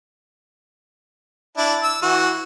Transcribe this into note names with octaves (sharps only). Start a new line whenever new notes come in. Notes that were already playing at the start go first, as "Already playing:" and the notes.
D4 E4
E6
E3 F#4